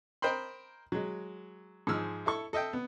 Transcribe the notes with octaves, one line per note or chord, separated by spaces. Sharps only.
A#4 C5 D#5 G5 B5 C6
F#3 G#3
G#2 F3 G#4 E6 F6
E4 A4 C#6
A4 D#5 E5 G5
B3